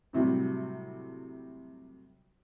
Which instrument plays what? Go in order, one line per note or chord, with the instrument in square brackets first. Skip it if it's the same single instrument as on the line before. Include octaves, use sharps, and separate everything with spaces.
[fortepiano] A2 C3 F#3 G3